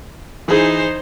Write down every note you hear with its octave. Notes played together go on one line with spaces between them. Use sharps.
E3 D#4 G#4 C5